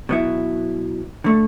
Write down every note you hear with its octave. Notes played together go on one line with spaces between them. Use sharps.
B2 F#3 B3 E4
D3 A3